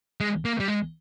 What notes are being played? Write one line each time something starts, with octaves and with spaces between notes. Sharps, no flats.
G#3
A#3
G3
G#3